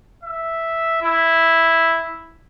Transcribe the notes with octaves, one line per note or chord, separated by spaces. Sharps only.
E5
E4